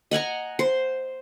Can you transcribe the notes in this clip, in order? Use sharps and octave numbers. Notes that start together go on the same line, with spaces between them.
D#5 F#5 G#5 A#5
C5